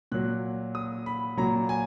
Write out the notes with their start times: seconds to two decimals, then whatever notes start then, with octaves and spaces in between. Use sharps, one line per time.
0.12 A#2 F#3 F#6
0.75 D#6
1.06 B5
1.37 A#2 F#3 A#5
1.69 G#5